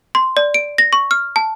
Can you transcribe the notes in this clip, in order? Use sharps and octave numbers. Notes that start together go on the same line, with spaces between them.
C6
D5
D7
A#6
C#6
F6
A5